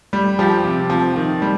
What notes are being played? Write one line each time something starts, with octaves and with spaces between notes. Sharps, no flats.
G3
F3 G4
C3
F3
D#3
G3